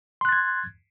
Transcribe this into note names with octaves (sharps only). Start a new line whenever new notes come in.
C6 F#6 G#6 A6